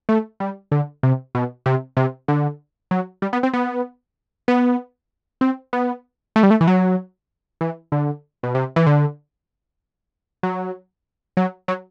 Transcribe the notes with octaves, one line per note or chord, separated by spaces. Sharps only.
A3
G3
D3
C3
B2
C3
C3
D3
F#3
G3
B3
C4
B3
B3
C4
B3
A3
G3
A3
E3
F#3
E3
D3
B2
C3
E3
D3
F#3
F#3
F#3